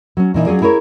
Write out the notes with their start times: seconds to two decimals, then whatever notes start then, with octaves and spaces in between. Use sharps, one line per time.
0.17 F#3 C#4
0.34 A#2 E3 D#4
0.46 F#3 C#4 F4 G#4 D5
0.62 E4 G#4 A#4 C#5